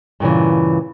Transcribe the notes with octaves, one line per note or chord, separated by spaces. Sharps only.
G2 A#2 C#3 E3